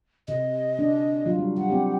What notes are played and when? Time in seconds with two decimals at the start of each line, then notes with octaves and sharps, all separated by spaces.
0.28 C3 D#5
0.79 D4
1.26 F#3 F4
1.38 G3
1.58 G3 F#5
1.70 C4 G4